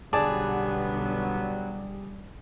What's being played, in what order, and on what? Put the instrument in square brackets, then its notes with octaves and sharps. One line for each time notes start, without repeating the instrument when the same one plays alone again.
[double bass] B1 D3 [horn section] F#3 B3 [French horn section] G3 [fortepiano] G#4 D5 A5